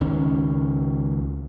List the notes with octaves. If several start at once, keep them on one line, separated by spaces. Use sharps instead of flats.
C#2 D#3 C#4